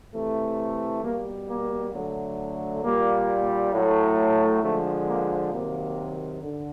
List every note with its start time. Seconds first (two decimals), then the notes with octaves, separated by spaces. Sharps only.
0.13 C3 E3 A3
1.02 B2 G3 A#3
1.48 A#3
1.93 D3 F#3 A3
2.83 A#2 G3 A#3
3.72 A2 F#3 A3
4.62 D3 F3 G#3 A3
5.07 A#3
5.52 C3 D#3 F#3 A#3
6.41 D3